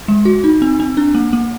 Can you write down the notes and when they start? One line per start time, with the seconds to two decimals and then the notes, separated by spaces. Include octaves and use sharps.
0.08 G#3
0.25 F#4
0.44 D#4
0.62 C4
0.80 C4
0.97 D4
1.15 A#3
1.33 A#3